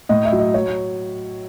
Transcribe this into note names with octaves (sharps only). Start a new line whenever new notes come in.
A2 D#5
E5
F#3
D#5
F#3 C#5